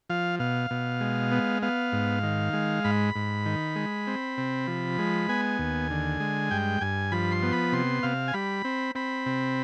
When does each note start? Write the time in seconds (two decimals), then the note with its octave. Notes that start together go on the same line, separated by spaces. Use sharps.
0.10 F3 F5
0.39 B2 F5
0.71 B2
1.01 G#3
1.32 B3
1.62 B3 F5
1.92 G#2
2.23 D#3
2.53 G#3
2.84 G#2 B5
3.15 G#2
3.46 D#3
3.76 G#3
4.07 C4
4.38 C3
4.67 F3
4.98 G#3
5.29 B3 G#5
5.59 D#2
5.90 D3
6.20 G#3
6.51 G2 G5
6.81 G2 G#5
7.12 F3 B5
7.32 C6
7.43 B3
7.52 B5
7.72 C3 C6
8.03 C3 F5
8.28 G#5
8.34 G3 B5
8.65 C4
8.95 C4 B5
9.26 C3